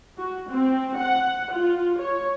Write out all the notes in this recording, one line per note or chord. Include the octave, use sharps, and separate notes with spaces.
F#4
C4
F#5
F4
C#5